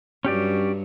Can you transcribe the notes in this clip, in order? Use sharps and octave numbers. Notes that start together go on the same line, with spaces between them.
G2 F#3 C#4 G4 D5